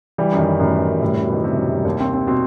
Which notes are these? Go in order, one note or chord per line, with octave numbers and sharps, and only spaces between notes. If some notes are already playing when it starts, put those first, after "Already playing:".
E3 G3
F#2
D#3
F#2
F#2 A2
E3
F#2
A2 G3
F#2 A2
B2
D#3 E3
C3 G3
F#2
G3
D#2
C4
C4
B2 C4